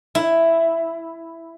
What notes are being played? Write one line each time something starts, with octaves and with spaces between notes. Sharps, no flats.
E4